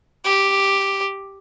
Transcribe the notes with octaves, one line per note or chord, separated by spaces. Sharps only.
G4